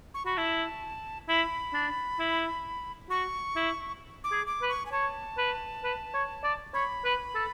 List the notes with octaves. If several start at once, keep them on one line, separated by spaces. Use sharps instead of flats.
C#6
F#4 B5
E4 A5
E4 B5
D4
E4
F#4 C#6
E4
D6
G#4
D6
B4
C#6
G#5
C#5 A5
B4
B4
C#5
D5
C#5 B5
B4
A4